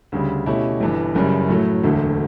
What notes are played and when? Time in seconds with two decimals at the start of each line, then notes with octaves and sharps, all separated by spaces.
0.12 D2 C#3 G3
0.46 B2 A3 C#4 E4 G4
0.80 G1 G2 E3
1.15 F#1 F#2 C#3 G3
1.49 A2 F#3 A3
1.83 E1 D2 D3 A3